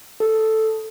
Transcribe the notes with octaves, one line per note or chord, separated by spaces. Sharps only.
A4